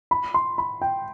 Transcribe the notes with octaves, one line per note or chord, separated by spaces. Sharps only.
B5
C6
B5
G5